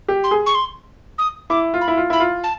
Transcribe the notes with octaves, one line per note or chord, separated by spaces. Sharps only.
G4
C6
G#4
C#6
C6
D#6
E4 D6
F4
B5
E4
F4
E4 B5
F4
A5